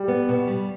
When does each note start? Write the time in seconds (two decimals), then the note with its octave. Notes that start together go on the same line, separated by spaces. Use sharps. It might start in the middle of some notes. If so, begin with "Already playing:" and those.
Already playing: G3
0.08 B3
0.28 B2
0.47 G3